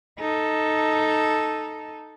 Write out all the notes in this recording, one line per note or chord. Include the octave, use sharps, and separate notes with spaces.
D#4 A4